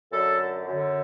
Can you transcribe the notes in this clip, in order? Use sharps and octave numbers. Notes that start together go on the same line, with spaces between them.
F#2 D3 A4
F#2 D3